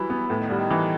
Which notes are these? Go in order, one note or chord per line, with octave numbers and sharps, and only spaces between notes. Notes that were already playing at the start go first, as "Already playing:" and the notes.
Already playing: E3 F#3 G3 E4
B3
A2 E3
D#3
D3 G3
D#3
E3